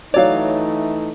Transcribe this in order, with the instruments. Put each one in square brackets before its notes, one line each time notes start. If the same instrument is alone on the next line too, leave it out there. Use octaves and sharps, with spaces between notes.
[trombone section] E3 A3 D#4 [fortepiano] F#3 D5 [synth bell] C#5 F5